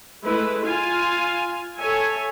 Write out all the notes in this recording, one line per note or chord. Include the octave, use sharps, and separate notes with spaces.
G#3 A3 E4 B4
F4 F5 G#5
A4 C#5 E5 G#5